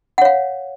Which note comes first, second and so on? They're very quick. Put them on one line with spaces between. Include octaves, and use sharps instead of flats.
F#5 C#5 F5